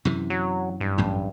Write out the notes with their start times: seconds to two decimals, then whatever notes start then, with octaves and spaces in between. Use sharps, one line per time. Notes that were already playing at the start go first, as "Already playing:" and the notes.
0.05 F#2 C3 E3
0.30 F#3
0.81 G2
0.98 A1 F#2 A2